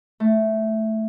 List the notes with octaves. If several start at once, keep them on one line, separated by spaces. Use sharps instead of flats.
A3